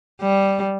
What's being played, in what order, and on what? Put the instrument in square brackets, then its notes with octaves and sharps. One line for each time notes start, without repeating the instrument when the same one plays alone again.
[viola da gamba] G3